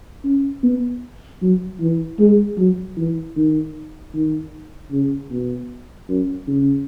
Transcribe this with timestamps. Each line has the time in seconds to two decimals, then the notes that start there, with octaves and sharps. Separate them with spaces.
0.24 C#4
0.63 B3
1.42 F#3
1.80 E3
2.19 G#3
2.57 F#3
2.98 E3
3.36 D#3
4.13 D#3
4.91 C#3
5.31 B2
6.09 F#2
6.47 C#3